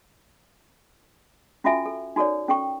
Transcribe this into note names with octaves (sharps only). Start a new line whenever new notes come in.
C#4 F4 F#4 A4 E5 G#5
A4
D#4 F#4 A4 A#4 C#5 D5
C#4 A4 G5 C#6